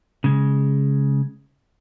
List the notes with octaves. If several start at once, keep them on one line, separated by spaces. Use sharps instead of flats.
C#3 G#3